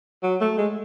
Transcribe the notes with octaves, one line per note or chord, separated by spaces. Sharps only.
F#3
A3
G#3